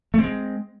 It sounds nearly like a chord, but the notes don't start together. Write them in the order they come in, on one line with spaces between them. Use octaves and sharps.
A3 C4 G#3